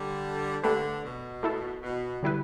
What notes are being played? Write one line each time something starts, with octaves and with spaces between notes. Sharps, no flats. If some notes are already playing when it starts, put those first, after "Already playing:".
Already playing: D3 G3
D3 A3 G4 B4
B2
A3 E4 A4
B2
D3 G3 E4 B4